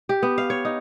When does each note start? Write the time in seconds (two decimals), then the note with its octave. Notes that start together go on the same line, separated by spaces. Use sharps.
0.09 G4
0.23 B3
0.38 F5
0.50 C#5
0.65 D#4